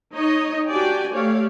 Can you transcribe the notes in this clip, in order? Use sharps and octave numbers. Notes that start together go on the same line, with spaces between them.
D#4 C#5 D#5
D4 F#4 G4 D5 G5 G#5
A3 G4 C#5 D5 F5